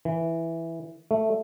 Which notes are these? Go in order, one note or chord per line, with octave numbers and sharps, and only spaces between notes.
E3
A3